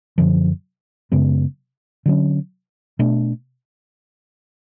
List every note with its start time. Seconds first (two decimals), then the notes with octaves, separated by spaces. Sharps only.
0.18 F#2 D3 F3
1.12 F#2 C#3 G#3 B3
2.06 D3 F#3 C#4
2.99 B2 A3 D4